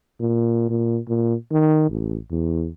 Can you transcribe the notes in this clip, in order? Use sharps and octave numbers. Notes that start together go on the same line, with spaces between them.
A#2
A#2
A#2
D#3
A1
E2